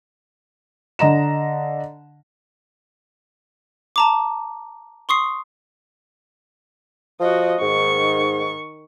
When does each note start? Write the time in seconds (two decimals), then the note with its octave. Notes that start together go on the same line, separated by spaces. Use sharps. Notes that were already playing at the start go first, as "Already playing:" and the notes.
0.99 D3 D#5 A#5 E7
3.96 A5 A#5 D6
5.09 C6 C#6 D#6 C7
7.20 F3 F#4 D#5
7.61 G#2 D#3 C#6